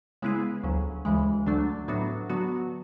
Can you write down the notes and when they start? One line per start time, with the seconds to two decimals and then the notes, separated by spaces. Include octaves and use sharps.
0.22 C#3 G#3 B3 E4 G#4
0.63 D2 C#3 F#3
1.05 D2 C#3 E3 G#3
1.46 D2 D3 F#3 A3 D4
1.88 A2 F#3 B3 D4 F#4
2.30 D3 F#3 B3 F#4